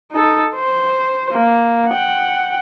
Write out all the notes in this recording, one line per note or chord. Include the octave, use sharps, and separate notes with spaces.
D#4 A4
C5
A#3
F#5 G5